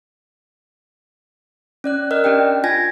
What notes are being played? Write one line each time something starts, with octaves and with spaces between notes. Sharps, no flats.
C#4 D5 F#6
A#4 D5 D#5 F6
C#4 D4 G4 G5
F4 G#5 G#6 A#6